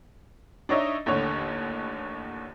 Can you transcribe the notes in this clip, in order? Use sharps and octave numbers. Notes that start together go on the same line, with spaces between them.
D4 D#4 C#5 D#5 E5
A1 D#2 D3 C#5